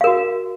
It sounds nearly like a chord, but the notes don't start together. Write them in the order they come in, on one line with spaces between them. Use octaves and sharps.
F5 A#4 F#4